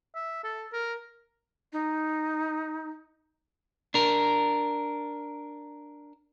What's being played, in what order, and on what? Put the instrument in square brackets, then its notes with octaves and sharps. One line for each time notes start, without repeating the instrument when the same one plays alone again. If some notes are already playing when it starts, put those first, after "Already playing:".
[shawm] E5
A4
A#4
[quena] D#4
[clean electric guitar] D4 A#4